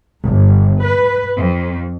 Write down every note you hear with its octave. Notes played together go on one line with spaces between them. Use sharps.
G1
B4
F2